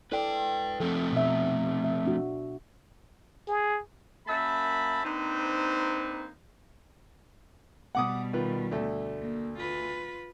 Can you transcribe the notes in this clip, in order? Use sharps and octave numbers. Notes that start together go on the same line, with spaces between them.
E4 A4 B4 D5 G5
F3 A3 C4 A4
B2 E5
E5
D4 F#4
G#4
F#2 A#3 E5 A5 B5
A#3 C4 D4 D#4 B4 C5
B2 G3 F#5 D6 D#6
D#3 F4 B4
D2 A3
A#3
F4 B4